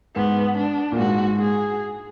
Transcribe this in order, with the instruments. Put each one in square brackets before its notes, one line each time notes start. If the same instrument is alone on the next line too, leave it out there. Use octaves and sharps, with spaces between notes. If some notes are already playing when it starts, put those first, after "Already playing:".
[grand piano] G#2 [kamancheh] B3
[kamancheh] D4
[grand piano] A#2
[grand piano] G#2 [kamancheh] F#4
[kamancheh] G#4